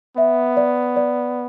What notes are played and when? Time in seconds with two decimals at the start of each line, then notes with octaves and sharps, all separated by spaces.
0.17 B3 E5
0.57 D5
0.96 D5